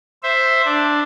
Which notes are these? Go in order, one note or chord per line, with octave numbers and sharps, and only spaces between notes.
C5 E5
D4